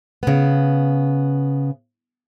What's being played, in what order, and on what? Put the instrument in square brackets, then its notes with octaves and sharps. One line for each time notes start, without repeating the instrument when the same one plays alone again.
[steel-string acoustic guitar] C#3 B3